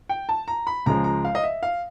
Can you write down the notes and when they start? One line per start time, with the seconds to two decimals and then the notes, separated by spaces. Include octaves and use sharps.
0.09 G5
0.29 A5
0.48 A#5
0.67 B5
0.86 C#2 C#3 F3 G#3 A#5
1.04 A#5
1.25 F5
1.35 D#5
1.44 E5
1.63 F5